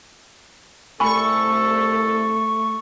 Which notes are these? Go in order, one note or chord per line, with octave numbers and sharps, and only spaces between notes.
C2 A3 A4 G#5 B5 C#6